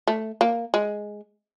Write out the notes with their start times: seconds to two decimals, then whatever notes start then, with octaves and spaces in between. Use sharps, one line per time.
0.07 A3
0.41 A#3
0.74 G#3